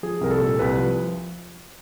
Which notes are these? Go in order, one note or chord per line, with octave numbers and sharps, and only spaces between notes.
F3 G#4
C2 A#4
A4
A#2
C2 B4
F3